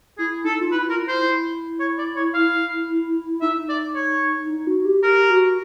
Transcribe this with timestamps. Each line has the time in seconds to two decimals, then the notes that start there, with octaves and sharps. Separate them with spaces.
0.18 E4 G#4
0.44 D#4 A4
0.61 F4
0.72 E4 B4
0.88 F4 A#4
1.00 E4
1.08 C5
1.26 E4
1.80 C#5
1.98 D5
2.16 C#5
2.34 F5
3.41 D#4 E5
3.69 D5
3.95 C#5
4.50 D#4
4.67 F#4
4.85 G4
5.03 G4 A#4
5.30 F#4